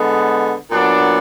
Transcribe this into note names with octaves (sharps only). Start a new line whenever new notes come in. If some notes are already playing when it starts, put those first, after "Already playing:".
Already playing: D3 G#3 B3
A#2 F#3 B3 D4